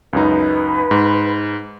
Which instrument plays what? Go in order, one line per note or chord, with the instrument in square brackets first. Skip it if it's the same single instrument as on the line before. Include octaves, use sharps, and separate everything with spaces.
[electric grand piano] C#2 F#2 D#4 [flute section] B4
[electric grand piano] G#2